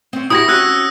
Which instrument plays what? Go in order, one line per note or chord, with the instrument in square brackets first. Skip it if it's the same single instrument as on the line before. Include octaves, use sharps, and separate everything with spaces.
[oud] C4 C#4
[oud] E4 F#4 G4 [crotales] D#6 A#6
[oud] C#4 F#4 [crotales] E6 F#6